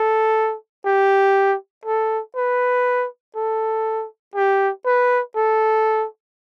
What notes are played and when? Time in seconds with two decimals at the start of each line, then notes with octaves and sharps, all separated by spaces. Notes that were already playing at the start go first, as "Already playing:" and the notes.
Already playing: A4
0.85 G4
1.85 A4
2.36 B4
3.36 A4
4.35 G4
4.86 B4
5.36 A4